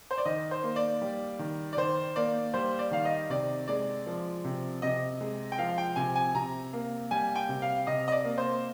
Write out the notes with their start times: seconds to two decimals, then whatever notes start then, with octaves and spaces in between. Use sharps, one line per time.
0.11 C5
0.18 D5
0.25 D#3 D#5
0.51 C5
0.63 A#3
0.76 D5
1.01 G3
1.39 D#3
1.73 D5
1.77 D#3 C5
2.16 A#3 D5
2.54 G3 C5
2.79 D5
2.91 D#3 F5
3.05 D#5
3.30 C3 D5
3.68 G#3 D5
4.06 F3
4.44 C3
4.82 C3 D#5
5.21 G#3
5.52 G5
5.58 F3 F5
5.78 G5
5.96 C3 G#5
6.16 G#5
6.35 C3 A#5
6.73 A#3
7.11 G3 G#5
7.35 G5
7.49 C3
7.62 F5
7.87 C3 D#5
8.08 D#5
8.12 D5
8.25 A#3
8.38 C5